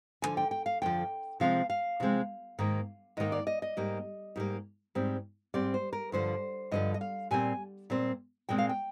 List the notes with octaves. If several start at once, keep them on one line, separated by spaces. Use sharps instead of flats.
F2 D3 F3 G#5
G5
G5
F5
F2 D3 F3 G5
C3 F3 G#3 C4 F5
F5
C3 F3 G#3 C4
G#2 D#3 A#3
G#2 D#3 A#3 D#5
D5
D#5
D#5
G#2 G3 A#3
G#2 G3 A#3
G#2 G3 C4
G#2 G3 C4 D5
C5
A#4
G2 D3 F3 C5
G2 D3 F3 D#5
D#5
F5
A#2 G3 C4 G#5
A#2 G3 C4
A#2 G#3 C4 G5
F5
G5